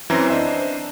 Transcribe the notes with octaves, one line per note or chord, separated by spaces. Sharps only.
F#2 E3 C4 C#4 C5 A#5
D4 C5 D#5 E5